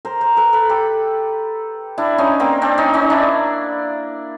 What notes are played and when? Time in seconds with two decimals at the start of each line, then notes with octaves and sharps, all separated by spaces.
0.05 A#4 C5
0.21 A#4 C5
0.37 A4 B4
0.53 A4 B4
0.69 G4 A4
1.98 D4 E4
2.18 C#4 D#4
2.40 A#3 C4
2.62 C4 D4
2.78 C#4 D#4
2.94 C#4 D#4
3.10 D4 E4